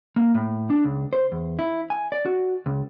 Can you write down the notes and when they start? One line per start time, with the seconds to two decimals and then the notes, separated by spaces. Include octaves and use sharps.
0.16 A#3
0.34 A2
0.70 D4
0.84 C#2
1.13 C5
1.32 E2
1.59 E4
1.90 G#5
2.12 D5
2.26 F#4
2.66 C#2